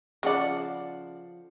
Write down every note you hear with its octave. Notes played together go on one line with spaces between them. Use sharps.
C#3 F3 A4 D5 F#5